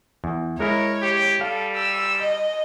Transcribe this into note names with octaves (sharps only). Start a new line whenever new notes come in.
E2
G#3 E4 A#4 C#5
G4
G3 A4 F5
E6
D#5